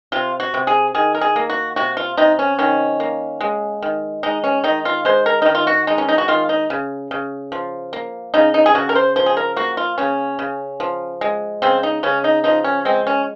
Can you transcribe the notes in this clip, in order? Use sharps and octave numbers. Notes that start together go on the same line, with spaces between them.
C3 F4
F#4
C3
G#4
D#3 G#4
A#4
G#4
A#3
F#4
C3 F#4
F4
C3 D#4
C#4
D#3 C#4
A#3
G#3
D#3
G#3 D#4
C#4
D#3 D#4
F4
G#3 C5
A#4
D#3 D#4
F4
F#4
G#3 D#4
C#4
D#4
F#4
D#3 F4
D#4
C#3
C#3
F3
A#3
C#3 D#4
D#4
G#4
C#3 F#4
A#4
C5
F3 C5
G#4
A#4
A#3 F#4
F4
C#3 C#4
C#3
F3
G#3
C#3 C4
D#4
C#3 C#4
D#4
F3 D#4
C#4
G#3 C4
C#4